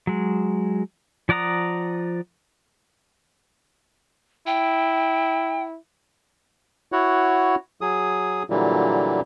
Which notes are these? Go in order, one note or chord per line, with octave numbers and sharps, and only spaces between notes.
F#3 G#3
F3 D5 F#5 A#5 D#6
E4 G5
E4 F#4 C#5 F#5
F#3 G#4 D#6
A#2 D3 E3 F#3 G3 A#3